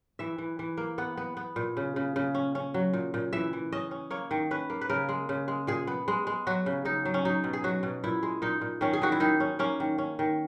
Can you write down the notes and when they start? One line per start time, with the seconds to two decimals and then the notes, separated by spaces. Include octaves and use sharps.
0.19 E3 E5
0.38 E3
0.59 E3
0.77 A#3
0.98 B3 F#5
1.17 B3
1.37 B3
1.56 A#2
1.77 C#3
1.96 C#3
2.16 C#3
2.35 C#4
2.55 C#4
2.74 F#3
2.93 A#2
3.14 A#2
3.33 E3 E5
3.53 E3
3.72 C#4 D#5
3.91 C#4
4.11 A#3 C#5
4.31 D#3
4.51 C#4 B4
4.70 A#3
4.81 B4
4.90 C#3 A#4
5.09 G#3
5.29 C#3
5.48 G#3
5.67 A#2 G#4
5.87 B3
6.08 G#3
6.27 G#3
6.47 F#3 F#4
6.66 C#3
6.85 C#3 D#4
7.05 F#3
7.14 C#4
7.25 F#3 D#4
7.44 B2
7.53 G#4
7.64 F#3 F#4
7.83 B2
8.04 A#2 E4
8.23 G#3
8.42 A#2 D#4
8.61 A#2
8.81 D#3 C#4
8.93 G#4
9.02 D#3 F#4
9.12 E4
9.20 D#3 D#4
9.40 C#4
9.59 A#3 C#4
9.80 D#3
9.98 C#4
10.19 D#3